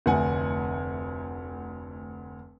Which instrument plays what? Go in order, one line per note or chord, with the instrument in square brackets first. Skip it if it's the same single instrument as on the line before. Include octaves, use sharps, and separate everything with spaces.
[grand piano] F1 D2 F#5 G#5